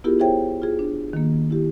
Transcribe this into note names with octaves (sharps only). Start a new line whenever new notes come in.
B3 E4 F4 G4 G#4 A#4
E4 G#4 C5 C#5 E5 G5
F4 G#4
D4
D#3 A#3
E4 G4